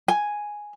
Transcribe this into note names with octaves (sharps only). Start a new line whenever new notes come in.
G#5